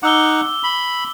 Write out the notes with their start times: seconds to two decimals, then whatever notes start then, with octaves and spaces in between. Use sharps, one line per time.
0.03 D#4 F#5 D6 E6 G7
0.63 B5